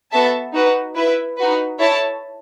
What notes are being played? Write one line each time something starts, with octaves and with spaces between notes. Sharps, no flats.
B3 F#4 A4 E5 A5
D#4 F#4 B4
E4 B4 E5
D#4 F#4 B4
E4 A4 C#5 E5 A5